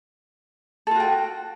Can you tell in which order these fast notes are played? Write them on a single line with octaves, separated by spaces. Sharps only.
A4 F4 F#4 G5